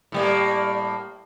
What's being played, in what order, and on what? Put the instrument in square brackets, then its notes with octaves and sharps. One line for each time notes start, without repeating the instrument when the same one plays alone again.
[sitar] A2 G3 A#3